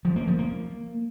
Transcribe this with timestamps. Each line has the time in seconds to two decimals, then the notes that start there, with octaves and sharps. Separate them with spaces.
0.05 F3
0.16 A#3
0.27 F3
0.39 A#3